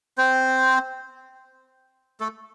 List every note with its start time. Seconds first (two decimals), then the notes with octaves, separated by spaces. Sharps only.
0.18 C4 C5
2.20 A3 A4